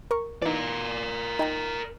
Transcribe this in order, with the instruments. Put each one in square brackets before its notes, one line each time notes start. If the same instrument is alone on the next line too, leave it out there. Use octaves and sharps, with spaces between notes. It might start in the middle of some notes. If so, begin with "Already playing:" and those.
[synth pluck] A#4 C#6
[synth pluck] E3 D#4 [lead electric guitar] A#4 D5
[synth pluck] D#4 G5 A#5